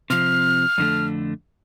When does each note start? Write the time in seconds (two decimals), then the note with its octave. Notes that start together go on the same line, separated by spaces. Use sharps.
0.10 C3 F3 C4 F6
0.78 F2 D3 A3